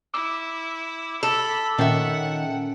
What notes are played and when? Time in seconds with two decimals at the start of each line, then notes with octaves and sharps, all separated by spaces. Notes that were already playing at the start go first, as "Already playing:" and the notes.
0.14 E4 D6 E6
1.23 A4 B5
1.78 A#2 D#3 C#4 E5 F#5 G5